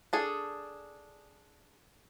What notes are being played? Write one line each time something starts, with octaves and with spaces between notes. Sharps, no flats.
D4 G#4 A4